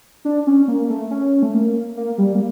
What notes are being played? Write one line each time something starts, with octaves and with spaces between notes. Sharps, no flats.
D4
C#4
A#3
A3
C#4
A3
A#3
A#3
G3
A#3